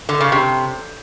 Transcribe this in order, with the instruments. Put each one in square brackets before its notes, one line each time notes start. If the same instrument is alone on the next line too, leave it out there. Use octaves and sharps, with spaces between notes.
[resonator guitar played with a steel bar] D3
C#3
C3